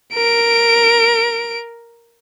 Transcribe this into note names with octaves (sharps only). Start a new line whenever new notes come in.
A#4 D7